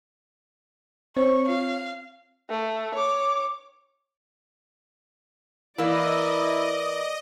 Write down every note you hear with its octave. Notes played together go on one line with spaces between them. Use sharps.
C4 C5 C#5 C#6
F4 F5
A3
C#5 D6
E3 A#3 E4 D5 D#5